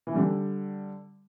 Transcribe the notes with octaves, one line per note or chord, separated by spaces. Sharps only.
E3
D3 G3